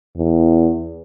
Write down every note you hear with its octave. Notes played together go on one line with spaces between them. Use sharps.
E2